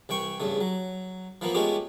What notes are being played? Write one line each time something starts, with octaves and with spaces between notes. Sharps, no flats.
C2 E3 G5 C#6
E2 G2 C#3 A3
F#3
E3 F3 A#3 B3
G#3 A3 B3 C#4 F4 G4